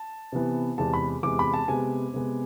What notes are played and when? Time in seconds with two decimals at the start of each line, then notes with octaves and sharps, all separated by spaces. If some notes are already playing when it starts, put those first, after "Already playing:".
Already playing: A5
0.32 C3 E3 B3
0.78 E2 C3 G#3 A5
0.93 B5
1.23 E2 C3 G#3 D6
1.39 B5
1.53 A5
1.68 C3 G#3 B3 G#5
2.14 C3 G#3 B3